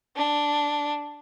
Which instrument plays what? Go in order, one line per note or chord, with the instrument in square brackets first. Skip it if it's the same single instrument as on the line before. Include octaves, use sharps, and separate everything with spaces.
[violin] D4